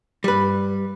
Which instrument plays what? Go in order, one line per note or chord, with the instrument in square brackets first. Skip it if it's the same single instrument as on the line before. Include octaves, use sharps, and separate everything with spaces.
[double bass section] G2 [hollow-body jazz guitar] G3 B4